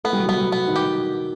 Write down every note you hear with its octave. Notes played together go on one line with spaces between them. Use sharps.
A3 B3
G3
F#3
G3 B3
F#3
B3
D#3
G4